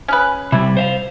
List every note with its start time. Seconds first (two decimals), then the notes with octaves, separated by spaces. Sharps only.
0.08 C#4 G#4 B4
0.52 C3 G3 E4
0.77 C5 E5 F5